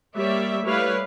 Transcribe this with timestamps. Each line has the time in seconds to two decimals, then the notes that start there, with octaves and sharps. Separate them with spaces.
0.18 G3 A#3 C#5 D5 E5
0.64 G3 A3 E4 B4 C#5 F5